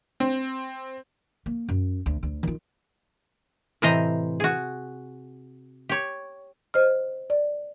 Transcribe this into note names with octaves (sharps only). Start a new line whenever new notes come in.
C4
A#3
F#2
D2
D2
D#3 F4
A2 C3 E3 C5 D#5 A#5
F#4 G#4
G4 C#5
C5 D#5 F6
D5